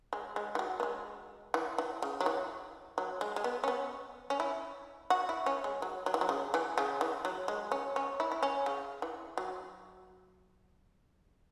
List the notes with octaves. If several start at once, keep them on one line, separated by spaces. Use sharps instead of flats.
G#3
G#3
E3
F#3
B3
G#3
E3
E3
C#3
F#3
E3
F#3
G#3
G#3
B3
C#4
B3
C#4
E4
F#4
E4
C#4
G#3
F#3
F#3
E3
F#3
C#3
E3
C#3
E3
F#3
G#3
C#4
C#4
E4
E4
C#4
C#3
E3
F#3